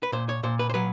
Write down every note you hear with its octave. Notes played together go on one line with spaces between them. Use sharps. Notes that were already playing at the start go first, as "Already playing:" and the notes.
B4
A#2 C5
C#5
A#2 C5
B4
C5
F#3 B4